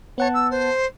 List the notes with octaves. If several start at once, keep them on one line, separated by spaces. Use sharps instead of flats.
B3 C#5 F#5 A5
E6
C5